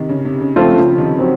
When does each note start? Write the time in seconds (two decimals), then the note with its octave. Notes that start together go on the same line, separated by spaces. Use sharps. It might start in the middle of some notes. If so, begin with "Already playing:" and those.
Already playing: C3 D#3
0.09 C#3
0.25 C3
0.41 C#3
0.56 C#3 F3 A3 C4 F4 C5
0.77 C#3 F3
0.98 C3 D#3
1.19 F#3 C4